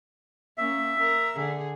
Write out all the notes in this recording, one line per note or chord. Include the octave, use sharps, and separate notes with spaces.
A#3 C#4 E5
A#4
D3 G#4